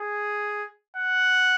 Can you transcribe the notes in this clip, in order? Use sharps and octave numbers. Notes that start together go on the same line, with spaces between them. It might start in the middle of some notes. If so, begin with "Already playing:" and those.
Already playing: G#4
F#5